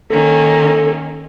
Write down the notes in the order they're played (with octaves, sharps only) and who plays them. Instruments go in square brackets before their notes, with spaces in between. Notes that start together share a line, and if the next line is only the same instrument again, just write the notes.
[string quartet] D#3 A#3 C#4 [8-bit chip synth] A4